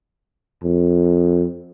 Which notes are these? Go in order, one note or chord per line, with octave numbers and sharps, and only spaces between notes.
F2